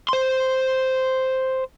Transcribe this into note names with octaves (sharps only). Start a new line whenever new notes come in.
C5 C6